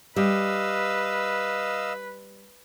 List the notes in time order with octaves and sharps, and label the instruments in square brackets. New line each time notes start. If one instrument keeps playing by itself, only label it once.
[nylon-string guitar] G3 [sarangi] B4 [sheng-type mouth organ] D#5 F5 E6